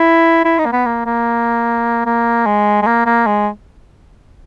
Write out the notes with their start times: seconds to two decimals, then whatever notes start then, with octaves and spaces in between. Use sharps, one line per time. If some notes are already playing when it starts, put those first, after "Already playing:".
Already playing: E4
0.45 E4
0.59 D#4
0.66 A#3
0.73 B3
0.86 A#3
1.06 A#3
2.06 A#3
2.46 G#3
2.82 G#3
2.87 A#3
3.06 A#3
3.27 G#3